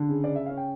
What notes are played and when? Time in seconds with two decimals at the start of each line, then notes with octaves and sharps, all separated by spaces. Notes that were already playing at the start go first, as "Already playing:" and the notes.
Already playing: D3
0.09 C#3
0.24 D5
0.29 C#3
0.35 E5
0.46 C#4 F5
0.57 G5